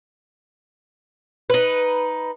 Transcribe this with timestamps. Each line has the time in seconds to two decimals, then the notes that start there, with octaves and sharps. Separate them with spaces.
1.50 D#4 B4